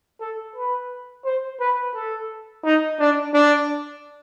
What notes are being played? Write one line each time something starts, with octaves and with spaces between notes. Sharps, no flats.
A4
B4
C5
B4
A4
D#4
D4
D4